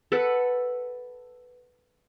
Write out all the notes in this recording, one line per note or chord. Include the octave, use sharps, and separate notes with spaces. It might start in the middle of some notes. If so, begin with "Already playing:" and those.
A4 B4 F#5